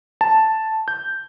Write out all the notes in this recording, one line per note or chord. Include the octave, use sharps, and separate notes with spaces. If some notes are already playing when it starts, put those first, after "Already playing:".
A5
G6